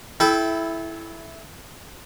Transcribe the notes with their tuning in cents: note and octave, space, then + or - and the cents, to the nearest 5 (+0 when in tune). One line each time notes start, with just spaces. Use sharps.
E4 +0 A4 -30 G5 +0